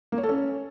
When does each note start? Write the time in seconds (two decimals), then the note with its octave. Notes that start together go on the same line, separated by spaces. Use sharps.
0.12 A#3
0.18 C#5
0.23 A4
0.29 C#4